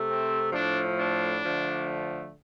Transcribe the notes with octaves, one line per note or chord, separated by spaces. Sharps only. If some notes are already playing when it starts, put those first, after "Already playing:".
Already playing: C3 A3
C4
A2 F3 A3 D4
D4
D3 F3 A3